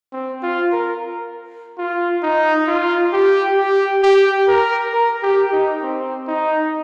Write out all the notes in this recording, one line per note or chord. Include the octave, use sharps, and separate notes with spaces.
C4
F4
A#4
F4
D#4
F4
G4
G4
G4
A#4
A#4
G4
D#4
C4
D#4